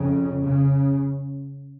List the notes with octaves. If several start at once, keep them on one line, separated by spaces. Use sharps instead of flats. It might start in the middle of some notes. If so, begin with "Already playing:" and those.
Already playing: F2 C#3
C#3